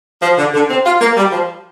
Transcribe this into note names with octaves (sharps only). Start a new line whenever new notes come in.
F3
D3
D3
C4
F4
A#3
G3
F3